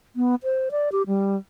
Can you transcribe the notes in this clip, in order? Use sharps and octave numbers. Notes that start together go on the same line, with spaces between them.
B3
C5
D5
G4
G3